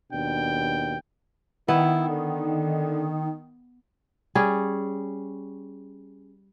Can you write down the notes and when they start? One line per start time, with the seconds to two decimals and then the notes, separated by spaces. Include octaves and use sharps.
0.12 D#2 B2 D4 G5
1.68 D#3 B3 E4
2.08 D3
4.35 G3 C#4 G#4